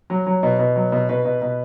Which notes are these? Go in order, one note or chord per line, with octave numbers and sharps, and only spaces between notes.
F#3
F#3
B2
B2
F#3
B2
B2 B4
B2
B2